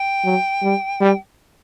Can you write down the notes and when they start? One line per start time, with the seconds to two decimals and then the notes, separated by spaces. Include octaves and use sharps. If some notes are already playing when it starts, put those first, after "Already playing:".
Already playing: G5
0.24 F#3
0.62 G3
1.00 G3